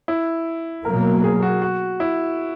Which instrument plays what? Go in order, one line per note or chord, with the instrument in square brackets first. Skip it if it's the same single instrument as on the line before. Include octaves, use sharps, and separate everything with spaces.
[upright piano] E4
[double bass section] B2 F#3 A#3 [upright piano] A#4
[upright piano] G#4
F#4
F#4
E4